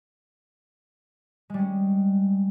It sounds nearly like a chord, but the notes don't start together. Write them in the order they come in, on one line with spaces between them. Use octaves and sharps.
G#3 G3 C#4